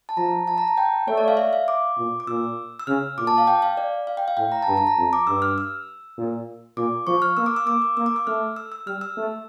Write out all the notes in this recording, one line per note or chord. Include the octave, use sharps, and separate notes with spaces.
A5
F3 A#5
A5
A#5
A5
G5
A3 C#5
D5
F5
E5
F5
D6
A#2
D6
A#2 E6
E6
C#3 F6
A#2 D6
A5
F5
G5
F5
D5
F5
G5
F5
A2 G5
A#5
A5
G2 A#5
A5
A#5
F2
D6
G2 E6
F6
E6
A#2
A#2 D6
F3 C#6
F6
A#3 E6
D6
E6
A#3 D6
E6
A#3 E6
D6
E6
A3 F6
E6
E6
G3 F6
E6
A3